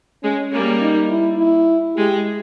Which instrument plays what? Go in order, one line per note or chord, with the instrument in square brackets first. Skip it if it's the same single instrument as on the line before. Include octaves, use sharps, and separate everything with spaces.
[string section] G#3 [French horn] C#4
[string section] G3 A#3 [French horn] C#4
[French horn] D#4
E4
E4
[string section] G#3 [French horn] G4